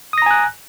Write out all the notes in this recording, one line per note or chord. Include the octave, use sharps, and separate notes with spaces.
G#5 A#5 D#6 F#6 A#6